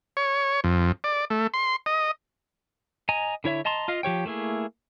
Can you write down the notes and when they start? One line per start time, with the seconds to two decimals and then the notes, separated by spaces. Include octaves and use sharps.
0.17 C#5
0.64 F2
1.04 D5
1.30 A3
1.54 C6
1.86 D#5
3.09 D#5 G#5 A#5
3.44 D3 E4 C#5 E5
3.65 D#5 A5 A#5 C6
3.88 F4 D#5 F5
4.03 F3 G4 C#5 G5
4.26 A3 A#3 E4 G#4